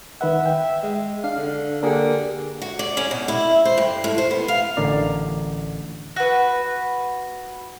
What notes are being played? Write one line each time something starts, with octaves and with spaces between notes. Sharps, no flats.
D#3 B4 E5 F#5
G5
G#3
D4 F5
D3
D3 A#3 G4 G#4 A#4
F#4
D5
C#4
B2
E4
C5
G2
A2
C5
B3
F5
A1 D3 A#4 D5
F#4 B4